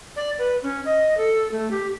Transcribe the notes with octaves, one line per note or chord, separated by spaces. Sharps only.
D5
B4
C#4
D#5
A4
A3
G4